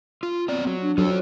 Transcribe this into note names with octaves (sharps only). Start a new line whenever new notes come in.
F4
F#3 B3 C4 D5
F#3
D4
F#3 F4 A4 C5